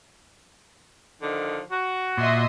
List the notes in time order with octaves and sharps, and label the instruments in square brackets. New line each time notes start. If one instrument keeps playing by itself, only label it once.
[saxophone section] D3 D#3 F3
F#4
[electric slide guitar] A#2 [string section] D#5 E5 C6